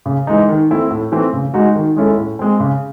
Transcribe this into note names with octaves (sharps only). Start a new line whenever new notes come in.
C#3
E3 G#3 D#4
D#3
A3 C4 E4
A2
E3 A3 C4
C#3
G#3 D#4 F#4
D#3
G#3 C#4 E4 A4
A2
G#3 C4
C#3